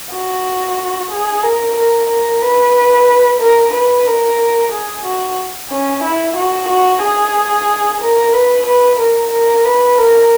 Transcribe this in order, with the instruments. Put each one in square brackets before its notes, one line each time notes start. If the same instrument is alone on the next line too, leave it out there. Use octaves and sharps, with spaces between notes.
[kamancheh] F#4
G#4
A#4
A#4
A#4
B4
A#4
B4
A#4
G#4
F#4
C#4
E4
F#4
F#4
G#4
A#4
B4
B4
A#4
A#4
B4
A#4